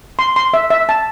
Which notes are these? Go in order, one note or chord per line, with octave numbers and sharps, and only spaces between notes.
C6
C6
E5
E5
A5